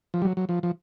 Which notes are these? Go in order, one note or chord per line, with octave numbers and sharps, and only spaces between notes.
F3
G3
F#3
F#3
F3
F3